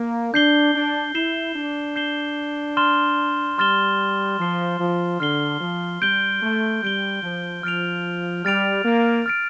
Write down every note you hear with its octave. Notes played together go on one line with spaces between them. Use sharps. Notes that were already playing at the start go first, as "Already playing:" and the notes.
Already playing: A#3
D4 G6 C7 G7
D4
E4 G6 C7 E7 G7
D4
G6 C7 E7 G7
C6 F6 A6 E7 G7
G3 C6 F6 A6 E7 G7
F3 F6 C7 G7
F3
D3 F6 C7 G7
F3
G3 G6 D7 G7
A3
G3 G6 D7 G7
F3
F3 F6 A6 D7 F7
G3 F6 A6 D7 F7
A#3
F6 A6 D7